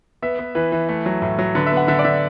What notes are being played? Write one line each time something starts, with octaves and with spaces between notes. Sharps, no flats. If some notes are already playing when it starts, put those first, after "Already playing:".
B3 E5
B3
E3 B4
E3
A3
F#3
A2
F#3
D3 B4
E5
B3
F#5
D3 E5
D5
D3 E5